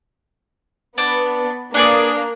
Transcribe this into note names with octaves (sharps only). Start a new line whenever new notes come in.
B3 D4
A#3 B3 D4 G#4 D5